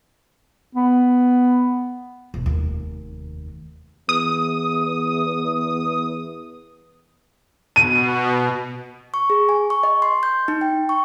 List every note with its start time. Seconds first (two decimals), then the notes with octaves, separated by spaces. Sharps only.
0.75 B3
2.34 E1
2.46 F1 D#2
4.09 E2 D#6
7.76 B2 D#7
9.14 C#6
9.30 G#4
9.49 G#5
9.70 C#6
9.83 D#5
10.02 C6
10.23 G6
10.48 D#4
10.61 G5
10.89 C#6